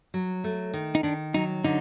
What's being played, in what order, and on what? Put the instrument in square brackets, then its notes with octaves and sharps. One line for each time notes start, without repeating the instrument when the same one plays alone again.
[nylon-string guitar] F#3
A3
D#3
[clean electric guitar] D#4
[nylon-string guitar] D#3 [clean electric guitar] D4
[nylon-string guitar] F#3 [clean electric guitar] D#4
[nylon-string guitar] D3 [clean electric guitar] D#4